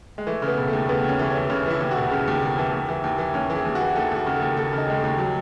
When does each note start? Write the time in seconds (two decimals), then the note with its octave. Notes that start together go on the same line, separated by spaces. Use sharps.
0.18 G#3
0.27 E3 A3
0.42 C#3
0.48 B3
0.58 E1
0.68 D#2 A3
0.89 C#3 B3
1.04 D#2
1.09 C#4
1.19 E3
1.30 E3 C#4
1.50 C#3 C#4
1.66 E3 E4
1.80 D#2
1.91 F#4
1.97 E1
2.11 C#3
2.27 D#2
2.42 E1
2.58 E3
2.72 D#2
2.88 E3
3.04 D#2
3.18 E3
3.34 D#2 C#4
3.50 E3
3.55 G#4
3.65 D#2
3.75 F#4
3.81 E3
3.96 D#2 A4
4.11 D#2 F#4
4.26 C#3
4.37 A4
4.42 D#2
4.57 D#2 A4
4.73 C#3
4.78 D#4
4.87 D#2 G#3
4.97 A3
5.04 D#2
5.18 F#3